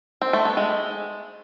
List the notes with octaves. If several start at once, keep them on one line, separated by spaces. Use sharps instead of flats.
C4
A3
B3
G#3